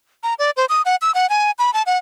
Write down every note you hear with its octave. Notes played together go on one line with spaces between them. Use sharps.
A#5
D5
C5
D#6
F#5
E6
F#5
G#5
B5
A5
F#5